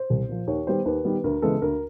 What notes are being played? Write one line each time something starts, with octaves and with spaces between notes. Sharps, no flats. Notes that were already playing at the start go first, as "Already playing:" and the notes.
Already playing: C5
C2
A#2 F3
D#2 C#5
D#3 G3 B3 C5
D#2 B4
D#3 G3 B3
D2 A#4
C#3 E3 G#3 B3 A4
D2 A#4